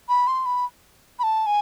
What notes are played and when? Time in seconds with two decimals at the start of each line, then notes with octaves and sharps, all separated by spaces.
0.09 B5
0.27 C6
0.46 B5
1.19 B5
1.23 A5
1.46 G#5